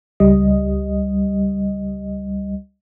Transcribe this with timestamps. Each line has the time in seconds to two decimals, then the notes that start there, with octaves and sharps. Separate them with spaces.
0.20 C#2 G3 D#5